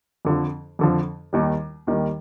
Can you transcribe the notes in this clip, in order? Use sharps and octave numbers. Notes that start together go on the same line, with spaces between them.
F2 D3 F3
F2 D3 F3
D#2 D#3 G3
D#2 D#3 G3